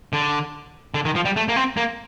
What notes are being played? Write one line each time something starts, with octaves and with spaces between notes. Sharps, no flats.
D3
D3
D#3
F3
G3
A3
A#3
C4
A#3